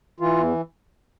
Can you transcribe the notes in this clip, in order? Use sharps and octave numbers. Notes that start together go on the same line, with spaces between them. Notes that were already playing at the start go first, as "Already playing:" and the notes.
E3 F4
E2